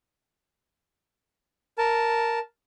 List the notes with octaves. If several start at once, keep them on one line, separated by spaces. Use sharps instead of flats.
A#4 A5